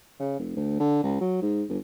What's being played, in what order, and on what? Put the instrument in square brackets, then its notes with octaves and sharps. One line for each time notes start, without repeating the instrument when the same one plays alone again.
[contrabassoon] C#3
F1
D2
D3
C#2
F#3
G#2
G1